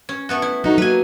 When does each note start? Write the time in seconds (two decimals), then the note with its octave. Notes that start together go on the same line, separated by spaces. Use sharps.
0.09 C#4
0.29 A3 B3 F#4
0.42 E4
0.64 F#3 D#4 F#4 A4
0.78 F#3 A#3 B4 G#5